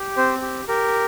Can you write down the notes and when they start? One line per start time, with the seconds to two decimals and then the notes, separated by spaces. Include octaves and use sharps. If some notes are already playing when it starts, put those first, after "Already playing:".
Already playing: G4
0.17 C4 C5
0.42 G4
0.68 G4 A#4